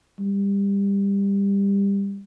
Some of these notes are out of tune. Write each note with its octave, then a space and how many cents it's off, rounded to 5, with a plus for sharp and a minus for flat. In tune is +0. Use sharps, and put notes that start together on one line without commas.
G3 +25